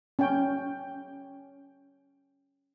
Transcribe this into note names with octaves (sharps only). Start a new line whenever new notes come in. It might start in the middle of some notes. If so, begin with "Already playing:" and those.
C#4 G5